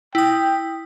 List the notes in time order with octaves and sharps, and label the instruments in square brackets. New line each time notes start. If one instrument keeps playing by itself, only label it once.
[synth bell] E4 D#6 [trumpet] G5